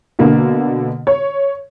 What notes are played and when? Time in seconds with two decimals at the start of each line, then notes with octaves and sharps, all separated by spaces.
0.19 B2 D3 A#3
1.07 C#5